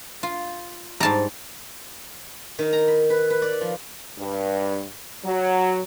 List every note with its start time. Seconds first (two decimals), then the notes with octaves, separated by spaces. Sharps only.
0.23 F4
1.00 G#2 G3 A5 A#5
2.59 D#3
2.73 A#5
2.88 B5
3.10 B4
3.30 B4
3.42 D5
3.61 F3
4.18 G2
5.25 F#3